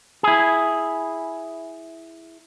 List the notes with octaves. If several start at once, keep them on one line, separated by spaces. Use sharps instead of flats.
E4 G#4